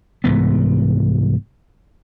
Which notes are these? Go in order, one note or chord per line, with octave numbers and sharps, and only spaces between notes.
C2 G#2 E3 B3